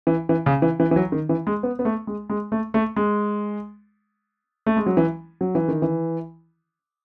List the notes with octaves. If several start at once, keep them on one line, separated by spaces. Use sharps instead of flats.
E3
E3
C#3
E3
E3
E3
F#3
D#3
E3
G#3
B3
B3
A3
G#3
G#3
A3
A3
G#3
A3
G#3
F#3
E3
F#3
E3
D#3
E3